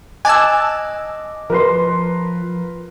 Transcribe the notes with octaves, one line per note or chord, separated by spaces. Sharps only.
D#5 G#5 A5 D6 E6 F#6
F3 A#4 B4 C6